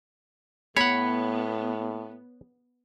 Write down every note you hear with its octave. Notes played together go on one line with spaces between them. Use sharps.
A2 B3 C#5 F#5 B5